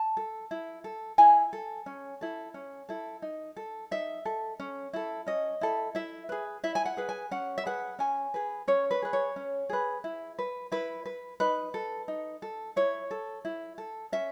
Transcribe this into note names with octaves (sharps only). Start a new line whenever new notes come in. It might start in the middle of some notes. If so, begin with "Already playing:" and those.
Already playing: A5
A4
E4
A4
E4 G#5
A4
C#4
E4 A4
C#4
E4 A4
D#4
A4
D#4 E5
A4
C#4
E4 A4
C#4 D#5
E4 A4
E4 E5
G#4 B4
E4 E5
G#5
F#5
G#4 B4
G#5
C#4 F#5
E5
G#4 B4 F#5
C#4 G#5
G#4 B4
C#4 C#5
B4
G#4 B4
C#5
C#4
G#4 B4
E4
B4
E4 B4
B4
D#4 B4
A4
D#4
A4
E4 C#5
A4
E4
A4
C#4 E5